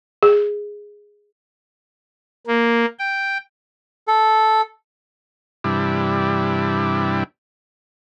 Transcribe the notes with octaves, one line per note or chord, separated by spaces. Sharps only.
G#4
A#3
G5
A4
G2 C3 E3 G3 D4 E4